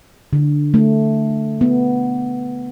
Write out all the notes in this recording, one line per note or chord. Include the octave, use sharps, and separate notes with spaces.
D3
A3
B3